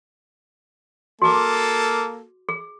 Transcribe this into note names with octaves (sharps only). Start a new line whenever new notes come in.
A#3 F#4 G#4 A4 D6
G#4